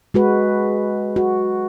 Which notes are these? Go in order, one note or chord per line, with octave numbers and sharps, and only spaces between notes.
G#3 F#4 B4
F#4